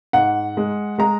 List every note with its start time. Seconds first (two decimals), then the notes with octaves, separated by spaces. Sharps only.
0.13 G#2 F#5
0.57 G#3
0.98 G#3 A#5